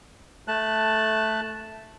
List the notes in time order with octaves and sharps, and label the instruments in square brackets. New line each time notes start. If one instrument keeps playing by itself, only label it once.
[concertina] A3 A5 F#6